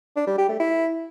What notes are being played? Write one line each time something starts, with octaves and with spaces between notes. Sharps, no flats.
D4
G3
G4
A3
E4